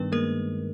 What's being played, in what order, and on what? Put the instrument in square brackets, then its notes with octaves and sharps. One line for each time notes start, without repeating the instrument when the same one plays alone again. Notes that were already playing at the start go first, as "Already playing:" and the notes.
Already playing: [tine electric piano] G2 D#3 [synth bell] B3 B4
[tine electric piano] G#3 [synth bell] A#3 A#4